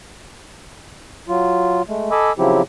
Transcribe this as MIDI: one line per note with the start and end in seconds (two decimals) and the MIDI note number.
1.29 1.82 54
1.29 1.82 65
1.89 2.11 56
1.89 2.11 57
2.11 2.33 69
2.11 2.33 75
2.11 2.33 80
2.11 2.33 83
2.11 2.33 86
2.11 2.33 88
2.38 2.62 49
2.38 2.62 53
2.38 2.62 54
2.38 2.62 60
2.38 2.62 64
2.38 2.62 67